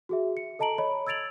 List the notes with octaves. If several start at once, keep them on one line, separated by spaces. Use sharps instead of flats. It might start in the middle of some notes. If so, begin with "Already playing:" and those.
F#4 G#4 E5
C#7
A4 D#5 A5 A#5 D7 F#7
C#5 D#5 B5
E6 G#6 A6 D7 F7 F#7